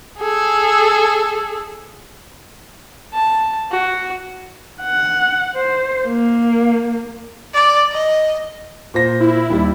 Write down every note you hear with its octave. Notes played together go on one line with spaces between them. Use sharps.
G#4 A4
A5
F#4
F#5
C5
A#3
D5
D#5
A#2 C5 A#6
E4
D#2 G3